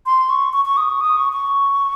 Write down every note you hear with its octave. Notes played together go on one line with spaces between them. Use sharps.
C6
C#6
C#6
C#6
D#6
C#6
D#6
C#6
C#6